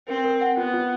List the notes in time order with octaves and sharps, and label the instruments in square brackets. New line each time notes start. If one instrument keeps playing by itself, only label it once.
[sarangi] C4 [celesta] A#4
[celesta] A#4
F#5
[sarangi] B3 [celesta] F4
[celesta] F4